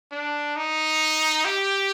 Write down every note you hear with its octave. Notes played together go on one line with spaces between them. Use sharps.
D4
D#4
G4